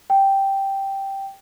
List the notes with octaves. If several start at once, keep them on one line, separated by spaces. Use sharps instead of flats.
G5